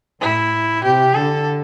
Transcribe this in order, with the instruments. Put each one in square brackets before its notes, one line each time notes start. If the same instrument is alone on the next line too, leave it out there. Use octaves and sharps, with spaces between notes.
[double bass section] A2 [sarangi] E4
[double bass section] C3 [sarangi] G4
[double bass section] D3 [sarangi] A4